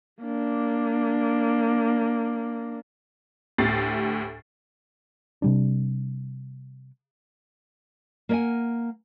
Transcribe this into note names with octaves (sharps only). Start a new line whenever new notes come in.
A#3 D4
D2 A2 G4 A6 C7
C3 G3 D4
A#3 A#4 C#5 E5 F#5 G#5